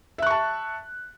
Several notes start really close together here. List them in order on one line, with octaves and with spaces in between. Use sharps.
E5 F#6 C#6 A5